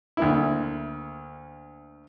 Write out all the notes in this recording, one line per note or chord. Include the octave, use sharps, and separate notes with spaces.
D2 A#3 E4